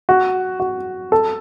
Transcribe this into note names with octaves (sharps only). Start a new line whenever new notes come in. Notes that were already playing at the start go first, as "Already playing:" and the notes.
F#4
F#4
A4